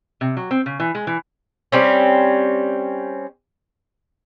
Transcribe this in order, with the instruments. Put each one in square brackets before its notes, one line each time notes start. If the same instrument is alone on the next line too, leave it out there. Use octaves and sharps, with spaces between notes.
[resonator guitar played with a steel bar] C3
F#3
C4
C#3
E3
G#3
E3
[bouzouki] G3 C4 C#4